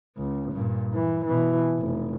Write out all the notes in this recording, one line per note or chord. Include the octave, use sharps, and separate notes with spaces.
C#2
G2 A#2
E3
B2 E3
F1